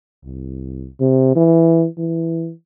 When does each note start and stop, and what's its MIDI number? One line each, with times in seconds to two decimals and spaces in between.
0.25 0.88 36
1.00 1.35 48
1.36 1.86 52
1.98 2.51 52